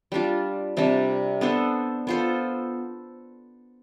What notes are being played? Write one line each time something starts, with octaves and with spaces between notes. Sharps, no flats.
G3 D4 F4
C3 G3 D4
B3 D4 A4 C5
B3 F4 A4 C5